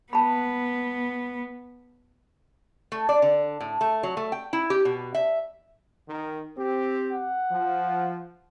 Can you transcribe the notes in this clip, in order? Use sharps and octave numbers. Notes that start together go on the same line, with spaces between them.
B3 A5 B5
A3
D5
D3
A2
A3
F#3
A3
G5
E4
G4
B2
E5
D#3
C4 G4
F#5
F3